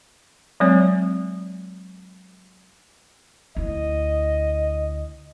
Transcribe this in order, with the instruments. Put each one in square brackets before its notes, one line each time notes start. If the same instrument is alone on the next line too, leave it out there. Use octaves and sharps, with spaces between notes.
[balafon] F#3 G#3 C4 C#5
[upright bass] D2 E4 [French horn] D#5